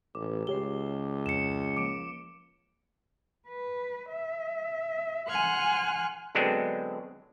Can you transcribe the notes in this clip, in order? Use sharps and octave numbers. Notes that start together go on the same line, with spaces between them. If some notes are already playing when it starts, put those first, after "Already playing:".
A1 D6
C#2 G4 C#5 C7 G7
F2 C#7 E7
F3 A#3 D6 D7
B4
E5
F#5 G#5 C6 F6 F#6
D3 F#3 G#3 B3 C4 D4